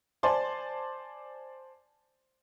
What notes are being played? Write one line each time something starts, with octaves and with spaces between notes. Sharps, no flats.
C5 D5 G#5 A5 C6